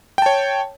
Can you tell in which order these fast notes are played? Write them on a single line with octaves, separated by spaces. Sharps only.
G5 A5 C#5